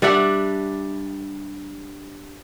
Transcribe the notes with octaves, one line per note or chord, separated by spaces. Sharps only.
G3 D4 E5 F#5